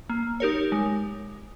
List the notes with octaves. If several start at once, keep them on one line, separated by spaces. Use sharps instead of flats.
A#3
D#4 G4 A#4 C#5
G#3